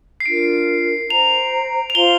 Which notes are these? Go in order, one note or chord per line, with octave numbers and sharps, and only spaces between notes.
C7
D4 F4 A#4 D7
C5 A#5 F7
F7
F4 C5 F5 G7